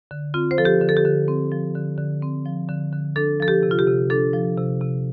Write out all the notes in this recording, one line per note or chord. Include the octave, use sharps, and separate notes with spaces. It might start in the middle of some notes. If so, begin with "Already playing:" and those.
D3
C4 F4
C5
F3 A4
G4
D3
A4
G4
D3
C4
F3
D3
D3
C4
F3
D3
D3
D4 A4
F3 A4
G4
C3
F4
G4
C3
D4 A4
F3
C3
C3